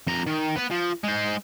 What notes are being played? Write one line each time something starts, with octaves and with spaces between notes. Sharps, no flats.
F2 A#5
D#3
B3 B4
F3
G#3 C5